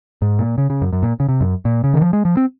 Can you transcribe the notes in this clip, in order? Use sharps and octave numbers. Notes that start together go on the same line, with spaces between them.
G#2
A#2
C#3
C#3
F#2
F#2
A#2
C#3
C3
F#2
A#2
C#3
D#3
F3
G#3
F3
C4